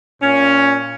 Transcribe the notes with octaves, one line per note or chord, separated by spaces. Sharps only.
A#2 C#4